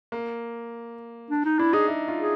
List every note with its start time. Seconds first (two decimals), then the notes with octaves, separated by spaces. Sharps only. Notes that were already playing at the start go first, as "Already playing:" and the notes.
0.12 A#3
1.30 D4
1.45 D#4
1.59 D4 E4
1.73 D#4 G#4
1.88 E4
2.08 F4
2.17 G#4